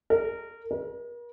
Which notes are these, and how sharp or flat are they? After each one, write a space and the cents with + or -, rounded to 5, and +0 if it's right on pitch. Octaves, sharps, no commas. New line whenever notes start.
A#4 -20
A#4 +45